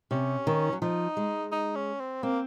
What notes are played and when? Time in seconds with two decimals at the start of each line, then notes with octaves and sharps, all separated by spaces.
0.11 C3 C#4
0.47 D#3
0.73 F#3
0.82 F3 D#4
1.17 G#3
1.52 D#4
1.75 C#4
2.00 C4
2.23 A#3 C4